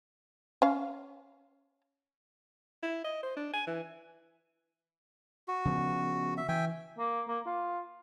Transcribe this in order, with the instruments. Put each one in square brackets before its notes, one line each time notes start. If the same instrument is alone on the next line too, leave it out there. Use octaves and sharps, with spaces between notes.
[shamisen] C#4 F5
[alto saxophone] E4
D#5
C5
D4
G#5
E3
[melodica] F#4
[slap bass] C#3 F3 B3
[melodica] E5
[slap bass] E3 [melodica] E5 G5 G#5
[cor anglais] A#3
A#3
F4